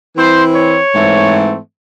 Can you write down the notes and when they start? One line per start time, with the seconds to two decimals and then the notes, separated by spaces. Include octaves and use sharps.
0.16 E3 C4 E4 C5
0.55 C#5
0.94 G#2 E3 A3 C4